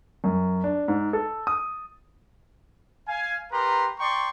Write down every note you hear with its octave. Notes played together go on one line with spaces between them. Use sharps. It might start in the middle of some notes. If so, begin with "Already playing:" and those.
F#2
D4
G#2
A4
D#6
F5 G#5
G4 A#4 B4 A#5 C6
D5 G5 A#5 C6 C#6